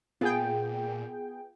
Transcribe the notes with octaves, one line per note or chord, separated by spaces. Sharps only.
A#2 B3 F4 G#4 G5